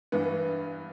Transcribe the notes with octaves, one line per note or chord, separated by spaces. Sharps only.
G2 E3 B3